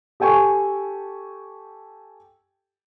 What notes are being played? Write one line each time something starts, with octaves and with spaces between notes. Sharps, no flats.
G4 A4 G5 G#5 C#6